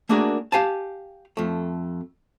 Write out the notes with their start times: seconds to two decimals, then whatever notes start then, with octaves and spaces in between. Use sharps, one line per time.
0.09 A3 A#3 D4 F#4 G#4 A#4
0.52 G4 F5 G#5 A5
1.37 F2 A3